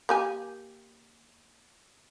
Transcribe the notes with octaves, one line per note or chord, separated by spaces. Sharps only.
A#3 G4 G#5